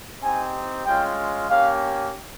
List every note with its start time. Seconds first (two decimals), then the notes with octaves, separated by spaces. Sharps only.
0.21 C4 D#4 G4 G#5
0.85 G#3 C#4 F4 G5
1.49 A#3 C#4 G4 F5